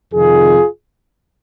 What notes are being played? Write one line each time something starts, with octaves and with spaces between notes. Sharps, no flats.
F2 C3 D#3 F4 G#4